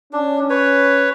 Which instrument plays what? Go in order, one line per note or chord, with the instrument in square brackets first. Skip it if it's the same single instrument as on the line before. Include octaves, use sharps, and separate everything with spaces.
[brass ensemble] C#4 [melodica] D4
[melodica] B4 C#5